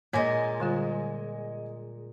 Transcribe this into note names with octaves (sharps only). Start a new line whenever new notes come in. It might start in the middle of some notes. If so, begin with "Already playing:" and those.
A#2 G#3 A#3 C#5 D#5 G#5
D3 G3 F4